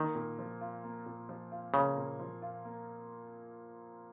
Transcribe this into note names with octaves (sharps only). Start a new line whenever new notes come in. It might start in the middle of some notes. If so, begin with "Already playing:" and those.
Already playing: D#3 A#3
A#2
F3
F4
A#3
A#2
F3
F4
C#3 A#3
A#2
F3
F4
A#3